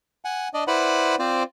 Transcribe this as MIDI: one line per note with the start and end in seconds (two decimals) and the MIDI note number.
0.25 0.48 78
0.25 0.48 80
0.54 0.64 62
0.54 0.64 74
0.54 0.64 75
0.67 1.15 64
0.67 1.15 71
0.67 1.15 72
0.67 1.15 74
0.67 1.15 78
0.67 1.15 83
1.19 1.43 60
1.19 1.43 65
1.19 1.43 72
1.19 1.43 74